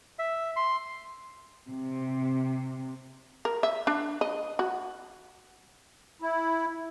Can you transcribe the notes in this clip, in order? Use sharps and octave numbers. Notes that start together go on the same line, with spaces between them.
E5
C6
C3
A#4
E5
D4
D#5
F#4
E4